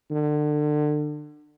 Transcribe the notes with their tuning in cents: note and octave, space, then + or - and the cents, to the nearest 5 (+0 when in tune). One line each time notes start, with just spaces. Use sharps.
D3 +30